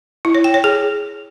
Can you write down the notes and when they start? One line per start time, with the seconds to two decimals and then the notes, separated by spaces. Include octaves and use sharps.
0.25 E4
0.35 C#5
0.44 G5
0.54 C#5
0.64 G#4